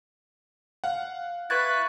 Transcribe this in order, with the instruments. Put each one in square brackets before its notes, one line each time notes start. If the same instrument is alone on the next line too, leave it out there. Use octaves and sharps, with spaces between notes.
[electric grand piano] F5 F#5
[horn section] E4 B4 [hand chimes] C#6 G#6 A6 [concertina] F#6